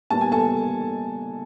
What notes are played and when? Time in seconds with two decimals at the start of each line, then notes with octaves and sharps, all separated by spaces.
0.10 A#2 G3 B3 A5
0.21 G#5
0.32 A4 A5